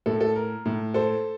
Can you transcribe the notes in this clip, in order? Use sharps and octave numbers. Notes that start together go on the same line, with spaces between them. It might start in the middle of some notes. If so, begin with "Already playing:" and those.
A2 A4
A4
A#4
A2
A4 C5